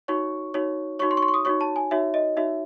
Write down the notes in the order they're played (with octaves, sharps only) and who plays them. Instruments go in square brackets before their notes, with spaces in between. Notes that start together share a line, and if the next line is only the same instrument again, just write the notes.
[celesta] D#4 F#4 C#5 C#6
D#4 F#4 C#5
D#4 F#4 C#5 C#6
C6
C#6
C6
C#6
D#6
D#4 F#4 C#5 C#6
A5
G#5
D#4 F#4 C#5 E5
D#5
D#4 F#4 C#5 E5